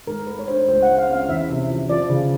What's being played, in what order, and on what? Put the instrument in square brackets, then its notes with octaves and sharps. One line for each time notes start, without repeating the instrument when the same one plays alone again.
[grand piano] G#2 [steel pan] A#4
[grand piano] A3 [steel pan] B4
[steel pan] C#5
[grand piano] D4 [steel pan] C5
[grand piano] C#2 [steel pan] C5
[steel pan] F#5
[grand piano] G#3
[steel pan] F5
[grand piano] C#4 [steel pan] F5
[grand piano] E2 [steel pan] E5
[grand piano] C3
F3
[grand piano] F3 [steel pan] D5
[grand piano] C#3